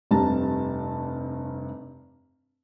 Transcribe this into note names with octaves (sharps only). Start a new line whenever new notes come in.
F1 G2 C3 G3 A5 A#5